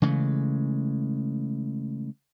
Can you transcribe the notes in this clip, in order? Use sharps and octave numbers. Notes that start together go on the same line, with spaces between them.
C#3 E3 G#3 A3